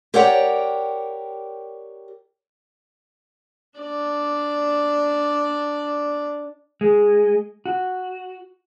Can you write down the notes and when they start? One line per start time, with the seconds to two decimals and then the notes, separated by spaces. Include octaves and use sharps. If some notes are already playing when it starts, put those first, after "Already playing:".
0.14 G4 A#4 C#5 D5 F#5 G5
3.79 D4 D5
6.81 G#3
7.66 F#4